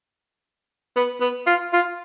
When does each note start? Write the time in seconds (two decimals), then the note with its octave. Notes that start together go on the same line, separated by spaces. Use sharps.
0.96 B3
1.21 B3
1.47 F4
1.73 F4